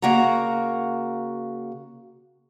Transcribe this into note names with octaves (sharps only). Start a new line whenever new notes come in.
C#3 A#3 F#4 F#5 A#5